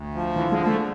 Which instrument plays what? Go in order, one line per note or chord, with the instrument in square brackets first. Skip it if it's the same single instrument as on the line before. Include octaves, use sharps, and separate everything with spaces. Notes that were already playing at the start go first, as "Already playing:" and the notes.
Already playing: [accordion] D2
F3
[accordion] D3 [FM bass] E3
[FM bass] G#3
[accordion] F3
[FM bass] A3